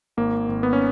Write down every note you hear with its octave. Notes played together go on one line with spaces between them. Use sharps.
G#1 A#3
G#1
B3
C#4